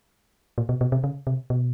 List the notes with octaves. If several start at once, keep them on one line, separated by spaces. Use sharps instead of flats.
A#2
B2
B2
C3
C#3
C3
B2